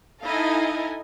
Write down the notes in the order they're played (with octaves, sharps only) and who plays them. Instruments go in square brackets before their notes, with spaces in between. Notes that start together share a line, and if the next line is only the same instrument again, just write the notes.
[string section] D#4 E4 A4 D#5 F5 G#5